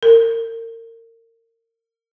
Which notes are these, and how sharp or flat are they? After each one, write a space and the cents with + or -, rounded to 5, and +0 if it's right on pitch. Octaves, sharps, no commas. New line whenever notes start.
A#4 -35